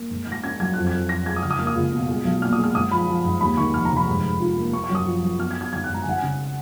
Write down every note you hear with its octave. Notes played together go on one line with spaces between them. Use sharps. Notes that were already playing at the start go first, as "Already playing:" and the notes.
Already playing: A#3
G#2
G#2
A#6
C#4 G#6
F#3 G#6
F2 F#6
G#6
F2
F2 A#6
G#3 G#6
D#6
C#2 F6
D#6
A#3 F6
D#6
C#2
B2
G#3
B1
A#2 F6
D#6
G#3 F6
G#2 D#6
F3 B5
F3
G#2
D#2 B5
D#3 C#6
F1 F6
A#5
F1
B5
G#2
G#2
F4
A#3
A#3 C#6
C#6
F#2
D#6
F3
F#2
B3 F6
G#6
B3
G#6
G#1 G#6
G#2 F#6
A#5
G#5
G#1 F#5
G#5
C#3